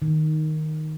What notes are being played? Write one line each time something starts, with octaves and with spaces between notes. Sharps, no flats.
D#3